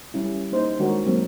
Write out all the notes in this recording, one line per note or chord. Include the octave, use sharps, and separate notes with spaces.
G3 C#4 E4
A#3 D#4 C5
D#3 G#3 D4 F#4 A#4 C#5
F#3 G#3 A#3 C4